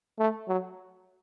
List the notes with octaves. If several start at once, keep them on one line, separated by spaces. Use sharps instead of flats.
A3
F#3